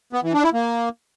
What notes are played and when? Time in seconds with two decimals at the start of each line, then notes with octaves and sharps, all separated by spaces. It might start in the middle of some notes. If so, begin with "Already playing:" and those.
0.13 B3
0.23 E3
0.33 D4
0.43 E4
0.54 A#3